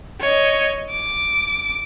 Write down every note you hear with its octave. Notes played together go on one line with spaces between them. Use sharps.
C#5 D#5
D6